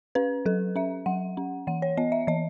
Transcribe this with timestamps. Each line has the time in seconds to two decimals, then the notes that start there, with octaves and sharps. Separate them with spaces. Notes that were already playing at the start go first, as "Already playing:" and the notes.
0.15 C#4 B4
0.45 F#3 A4
0.76 C#4 E5
1.06 F#3 F#5
1.37 C#4
1.67 E3 F#5
1.82 C#5
1.97 B3 D#5
2.12 E5
2.27 E3 D#5